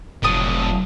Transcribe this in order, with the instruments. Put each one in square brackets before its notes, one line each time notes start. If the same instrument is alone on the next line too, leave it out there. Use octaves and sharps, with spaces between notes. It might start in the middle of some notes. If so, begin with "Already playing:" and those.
[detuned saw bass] F1 [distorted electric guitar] A2 F#3 [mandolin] D5 A5 D#6